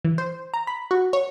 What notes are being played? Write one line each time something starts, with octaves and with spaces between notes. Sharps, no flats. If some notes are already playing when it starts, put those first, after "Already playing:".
E3
C5
A#5
B5
F#4
C#5